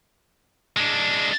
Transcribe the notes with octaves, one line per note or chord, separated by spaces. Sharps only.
G#3 D4